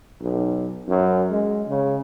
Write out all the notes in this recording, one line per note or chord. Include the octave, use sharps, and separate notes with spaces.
B1
F#2
G#3
C#3